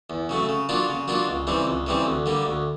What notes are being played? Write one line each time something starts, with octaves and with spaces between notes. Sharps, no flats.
E2
C#3 F#3 A3
C#3
F#3 A#3 D4 F4
C#3
F#3 A#3 D4 F4
C#2
C#3 E3 G3 C4
C#2
C#3 E3 G3 C4
D2
D3 G3 A#3
D2